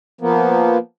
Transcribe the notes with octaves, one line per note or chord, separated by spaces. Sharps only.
F3 A#3 B3